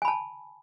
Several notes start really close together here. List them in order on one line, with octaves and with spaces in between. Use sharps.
G#5 B5 A5